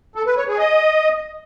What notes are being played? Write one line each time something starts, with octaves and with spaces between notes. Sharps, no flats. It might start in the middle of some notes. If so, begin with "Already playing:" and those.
A4
B4
C#5
G#4
D#5